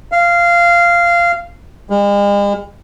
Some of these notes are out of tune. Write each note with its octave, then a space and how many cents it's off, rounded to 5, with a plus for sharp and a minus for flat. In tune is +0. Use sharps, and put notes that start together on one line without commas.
F5 -15
G#3 -45